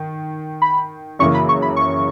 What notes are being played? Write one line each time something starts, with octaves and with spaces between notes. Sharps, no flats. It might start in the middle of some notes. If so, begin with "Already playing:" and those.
Already playing: D#3
B5
F#2 C#3 E3 A#3 C#6
B5
C#6
B5
C#6